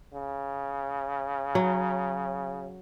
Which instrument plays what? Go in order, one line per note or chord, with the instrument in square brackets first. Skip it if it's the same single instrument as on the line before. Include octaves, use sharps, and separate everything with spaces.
[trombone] C#3
[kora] F#3